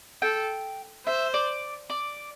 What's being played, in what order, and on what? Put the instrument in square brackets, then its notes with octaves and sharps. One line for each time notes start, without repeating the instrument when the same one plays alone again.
[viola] A4 [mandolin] G5
[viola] C5 [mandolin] E5
[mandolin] D5
D5